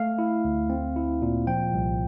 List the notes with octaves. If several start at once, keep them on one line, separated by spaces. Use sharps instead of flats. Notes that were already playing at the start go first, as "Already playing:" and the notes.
Already playing: A3 F5
E4
D2
C4
E4
A#2
F3 G5
C2